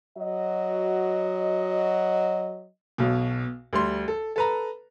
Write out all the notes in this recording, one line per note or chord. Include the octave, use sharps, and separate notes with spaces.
F#3 F#4 D#5
B1 B2
D2 G3 C6
A4
A4 B4 A#5